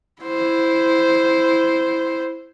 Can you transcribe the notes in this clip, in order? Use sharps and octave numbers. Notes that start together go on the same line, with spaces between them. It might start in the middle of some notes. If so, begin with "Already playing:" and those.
E4 C5